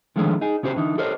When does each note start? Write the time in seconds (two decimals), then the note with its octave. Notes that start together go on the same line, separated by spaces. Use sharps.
0.16 D3 D#3 F3 G#3 A3 C#4
0.41 D#4 G#4
0.63 C#3 C#4 F#4 G4 C5
0.76 D3 E3 D#4
0.98 G4 A4 A#4 C5 C#5 D#5